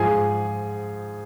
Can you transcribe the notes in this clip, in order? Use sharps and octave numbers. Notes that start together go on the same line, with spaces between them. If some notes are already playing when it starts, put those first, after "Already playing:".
Already playing: G#2 F3 G#4 G#5